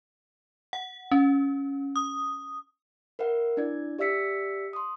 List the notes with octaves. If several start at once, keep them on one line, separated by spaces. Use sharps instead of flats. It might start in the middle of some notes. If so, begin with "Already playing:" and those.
F#5
C#4
D#6
A#4 B4 E5 F#5
D4 E4 D5 G#6
G4 D5 E5 E6 B6 C#7
C6 D#6